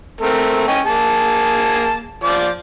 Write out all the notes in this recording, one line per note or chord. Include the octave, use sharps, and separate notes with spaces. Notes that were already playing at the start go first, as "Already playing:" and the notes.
A3 C4 A#4
C#4 D#5 G5
A#3 G#4 A5
F3 D5 D6